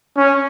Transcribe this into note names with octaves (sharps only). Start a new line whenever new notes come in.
C#4